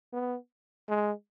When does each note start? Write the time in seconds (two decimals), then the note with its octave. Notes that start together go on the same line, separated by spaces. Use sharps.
0.13 B3
0.89 G#3